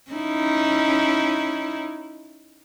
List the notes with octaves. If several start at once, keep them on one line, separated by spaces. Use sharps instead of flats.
C#4 D#4 E4